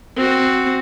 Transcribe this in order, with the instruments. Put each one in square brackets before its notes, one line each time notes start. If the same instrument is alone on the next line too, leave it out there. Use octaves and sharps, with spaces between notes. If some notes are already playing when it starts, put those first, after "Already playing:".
[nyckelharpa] C4 F#4